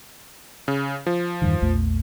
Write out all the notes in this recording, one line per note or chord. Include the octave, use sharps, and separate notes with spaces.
C#3
F3
E2 G2 D#3
A#1 E2 A3